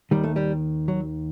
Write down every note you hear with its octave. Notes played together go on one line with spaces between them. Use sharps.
D#2 D#3 G3
A3
G3
F#3